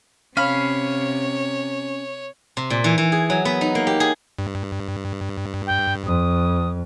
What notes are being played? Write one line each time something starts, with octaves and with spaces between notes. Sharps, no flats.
C3 C#4 C#5 F5 B5
C3
A#2
E3
E3
G#4
F#3
B3
D#4
A#3
G4
G#4
G2
G5
F2 D#6